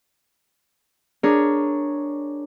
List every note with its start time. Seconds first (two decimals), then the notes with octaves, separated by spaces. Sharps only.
1.23 D4 G#4 A#4 C#5